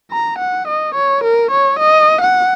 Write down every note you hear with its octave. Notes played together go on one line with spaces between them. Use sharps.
A#5
F#5
D#5
C#5
A#4
C#5
D#5
F#5